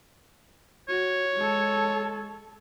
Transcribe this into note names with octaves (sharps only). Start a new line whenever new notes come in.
F#4 C#5
G#3 A4